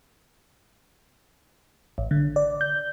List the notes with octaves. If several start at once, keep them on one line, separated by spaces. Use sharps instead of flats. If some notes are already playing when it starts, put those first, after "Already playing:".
A1
D3
D5
G6